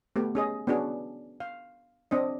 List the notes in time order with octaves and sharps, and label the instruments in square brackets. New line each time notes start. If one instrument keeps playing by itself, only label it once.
[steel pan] A3 B3 G4
C#4 G#4 D#5
B3 C#4 D4 F#4 G#4
F5
C4 D4 D#5